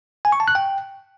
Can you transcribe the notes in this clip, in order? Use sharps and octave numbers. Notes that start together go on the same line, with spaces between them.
G#5
C#6
A5
F#6
G5